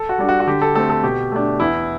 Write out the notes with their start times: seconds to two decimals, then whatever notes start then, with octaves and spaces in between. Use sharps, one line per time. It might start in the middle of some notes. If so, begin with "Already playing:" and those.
Already playing: A4
0.09 F#4
0.19 G3 D4
0.29 F#4
0.40 F#4
0.47 D3 G4
0.62 A4
0.75 A3 C4 A4
0.90 A4
1.03 B2 G4
1.32 A3 D4
1.60 E2 E4